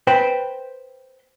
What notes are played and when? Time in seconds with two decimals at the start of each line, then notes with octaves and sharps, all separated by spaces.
0.07 B4 C5 G5